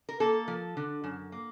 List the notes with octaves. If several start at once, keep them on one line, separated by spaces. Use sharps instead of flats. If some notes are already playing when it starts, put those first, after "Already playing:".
A#4
A#3 A4
F3
D3
F#2
A#3